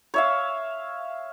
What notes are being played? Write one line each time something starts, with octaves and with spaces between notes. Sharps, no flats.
C#5 E5 F5